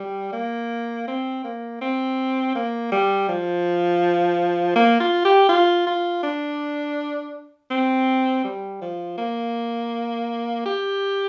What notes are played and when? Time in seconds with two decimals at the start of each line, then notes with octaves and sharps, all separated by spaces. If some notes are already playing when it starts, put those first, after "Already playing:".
Already playing: G3
0.33 A#3
1.08 C4
1.44 A#3
1.81 C4
2.55 A#3
2.92 G3
3.29 F3
4.76 A#3
5.00 F4
5.25 G4
5.49 F4
5.86 F4
6.23 D4
7.70 C4
8.44 G3
8.82 F3
9.18 A#3
10.66 G4